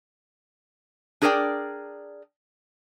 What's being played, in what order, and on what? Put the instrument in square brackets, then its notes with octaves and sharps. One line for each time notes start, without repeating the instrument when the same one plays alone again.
[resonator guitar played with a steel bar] D4 G#4 A#4 C5 D5 G5